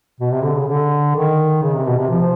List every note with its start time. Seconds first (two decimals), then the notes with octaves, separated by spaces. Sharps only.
0.20 B2
0.32 C3
0.44 D3
0.56 C#3
0.68 D3
1.15 D#3
1.63 C#3
1.74 C3
1.86 B2
1.98 C3
2.10 F3